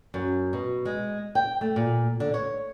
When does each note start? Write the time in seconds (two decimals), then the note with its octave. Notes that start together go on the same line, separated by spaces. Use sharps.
0.14 F#2
0.53 B2
0.85 G#3
1.35 G5
1.61 A3
1.76 A#2
2.20 D3
2.34 C#5